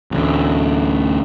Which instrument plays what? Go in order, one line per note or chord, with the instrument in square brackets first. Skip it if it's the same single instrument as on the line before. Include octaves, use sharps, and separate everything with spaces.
[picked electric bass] A1 D2